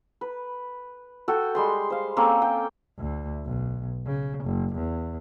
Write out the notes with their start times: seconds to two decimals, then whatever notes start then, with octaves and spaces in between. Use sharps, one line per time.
0.21 B4
1.28 F#4 A4 G5
1.55 G3 G#3 C6
1.90 C5 F5
2.17 A#3 C4 C#4 A4
2.42 G5
2.98 D2
3.45 B1
4.06 C#3
4.44 F#1
4.75 E2